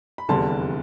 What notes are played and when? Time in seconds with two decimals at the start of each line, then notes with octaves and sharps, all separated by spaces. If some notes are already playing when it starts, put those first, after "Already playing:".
0.18 B5
0.29 F1 E2 D3 G3 A5 C6